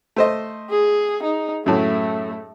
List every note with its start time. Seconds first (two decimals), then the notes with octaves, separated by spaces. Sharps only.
0.16 A3 C5 D#5
0.70 G#4
1.23 D#4
1.66 F#2 A2 A3